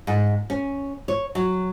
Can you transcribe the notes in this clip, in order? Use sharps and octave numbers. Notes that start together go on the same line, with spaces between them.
G#2
C#4
C#5
F#3